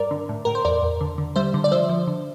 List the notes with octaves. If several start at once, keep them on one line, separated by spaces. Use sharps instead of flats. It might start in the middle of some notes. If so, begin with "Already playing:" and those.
Already playing: G2 A#4 D5
D3
A2
A2 A#4
C5
E2 A#4 D5
E2
D3
D3
G3 C5 E5
D3
D5
F3 C5 E5
F3
D3